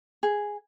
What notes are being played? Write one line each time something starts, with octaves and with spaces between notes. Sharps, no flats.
G#4